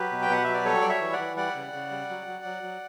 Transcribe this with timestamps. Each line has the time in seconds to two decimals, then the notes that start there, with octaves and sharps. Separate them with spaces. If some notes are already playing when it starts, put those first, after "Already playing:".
Already playing: F#3 G4 B4
0.11 B2
0.22 G5
0.30 B2 F#5
0.44 F#3 E5
0.54 D5
0.65 G3 A4 C#5
0.81 G3 D5
0.89 C#5 E5
1.01 E3
1.13 D5 F#5
1.19 E3
1.37 G3 D5 F#5
1.55 C#3
1.73 C#3
1.91 G3
2.10 F#3
2.27 F#3
2.45 F#3
2.63 F#3